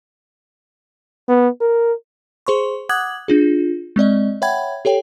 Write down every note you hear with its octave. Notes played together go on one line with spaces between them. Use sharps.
B3
A#4
G#4 C5 C6 C#6
F#5 D6 D#6 F#6 G#6 F#7
D4 F4 G#4
G#3 C4 D5 D#5
C#5 E5 F#5 G5 B5 G#6
G4 A4 C#5 G5